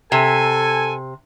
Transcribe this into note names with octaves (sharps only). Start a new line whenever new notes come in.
C3 A4 G#5